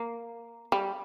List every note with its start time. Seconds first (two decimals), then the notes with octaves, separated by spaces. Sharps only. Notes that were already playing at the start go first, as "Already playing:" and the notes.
Already playing: A#3
0.72 G3